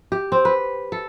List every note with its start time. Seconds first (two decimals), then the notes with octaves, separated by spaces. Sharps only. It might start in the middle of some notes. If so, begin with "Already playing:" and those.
0.12 G4
0.32 C4
0.45 B4
0.92 A4